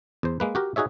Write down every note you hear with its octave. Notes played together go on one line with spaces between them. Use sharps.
E2 C5
G#3 A#3 B4
F#4 G4 A#4
D#4 F#4 G#4 C#5 E5